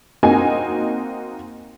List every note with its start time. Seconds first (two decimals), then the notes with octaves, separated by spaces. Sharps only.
0.23 A#3 C4 D#4 F#4 G#5